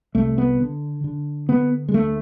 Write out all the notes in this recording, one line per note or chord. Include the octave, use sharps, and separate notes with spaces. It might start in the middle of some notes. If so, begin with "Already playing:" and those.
C2 A3
B3
D3
D3
D3 B3
G#3
D2 A3